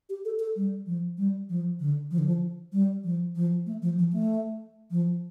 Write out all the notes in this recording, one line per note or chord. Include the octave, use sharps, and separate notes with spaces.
G4
A4
A4
G3
F3
G3
F3
D3
F3
D3
F3
G3
F3
F3
A3
F3
F3
A3
F3